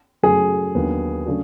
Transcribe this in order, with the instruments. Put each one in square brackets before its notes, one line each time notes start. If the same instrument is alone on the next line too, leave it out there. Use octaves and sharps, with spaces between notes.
[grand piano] F#2 C#3 F#3 A3 [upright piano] G#4
[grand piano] D#2 D3 F#3 B3
C#3 F#3 A3 D4 F#4